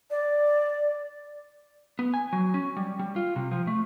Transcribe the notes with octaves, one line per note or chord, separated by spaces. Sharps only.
D5
B3
G#5
F#3
C#4
G3
G3
F4
C3
F3
A3